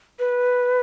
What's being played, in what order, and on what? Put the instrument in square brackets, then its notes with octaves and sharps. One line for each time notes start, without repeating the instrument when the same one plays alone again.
[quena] B4